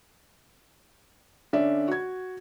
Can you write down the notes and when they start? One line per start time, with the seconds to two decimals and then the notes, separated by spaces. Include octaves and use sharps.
1.53 D3 C#4 D5 E5
1.88 F#4 G#6